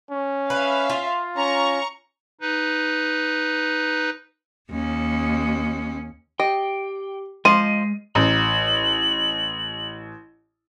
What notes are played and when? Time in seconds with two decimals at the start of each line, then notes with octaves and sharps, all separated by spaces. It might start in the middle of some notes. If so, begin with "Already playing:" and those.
0.11 C#4
0.50 B4 E5 F5
0.90 F4
1.37 C#4 A#5 C#6
2.41 D#4 B4
4.71 D#2 C#4
6.40 G4 D#5 G5
7.45 F3 G#3 C5 D#5 C7 D#7
8.15 A1 F#7